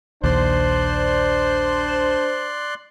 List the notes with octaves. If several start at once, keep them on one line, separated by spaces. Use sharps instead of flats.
A#1 D#2 D4 C5 D5 C6 F#6